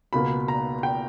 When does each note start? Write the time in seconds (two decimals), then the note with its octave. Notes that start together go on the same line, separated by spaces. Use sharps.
0.13 C#2 B2 A#3 B5
0.48 A#5
0.83 G5